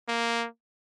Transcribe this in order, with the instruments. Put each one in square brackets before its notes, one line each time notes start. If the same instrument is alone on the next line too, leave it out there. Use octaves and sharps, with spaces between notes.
[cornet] A#3